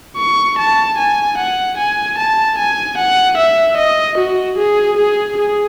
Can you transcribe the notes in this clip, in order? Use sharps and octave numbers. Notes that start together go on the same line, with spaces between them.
C#6
A5
G#5
F#5
G#5
A5
G#5
F#5
E5
D#5
F#4
G#4
G#4
G#4